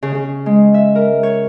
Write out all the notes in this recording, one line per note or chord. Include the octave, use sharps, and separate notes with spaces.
C#3
C#3
G#3
E5
A#4
C#5